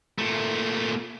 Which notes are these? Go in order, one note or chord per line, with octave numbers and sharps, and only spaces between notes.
A#2 A3